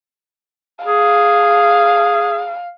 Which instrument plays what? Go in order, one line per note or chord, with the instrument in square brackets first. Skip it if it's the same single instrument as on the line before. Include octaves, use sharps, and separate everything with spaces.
[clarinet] G#4 [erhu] F5